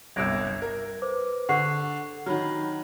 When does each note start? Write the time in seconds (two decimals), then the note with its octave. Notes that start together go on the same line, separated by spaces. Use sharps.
0.16 G1 C2 E6 G#6 A#6 D7
0.62 A#4
1.02 B4 C5 D6
1.49 D3 F#5 C#6 C7
2.26 D#3 F#3 F#5 B5 F6